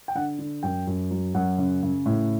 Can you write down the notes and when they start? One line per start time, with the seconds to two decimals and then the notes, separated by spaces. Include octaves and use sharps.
0.08 G5
0.15 D3 F#5
0.39 D3
0.63 F#2 G5
0.87 F#2
1.11 F#3
1.34 F#2 F#5
1.58 C#3
1.83 C#3
2.06 A2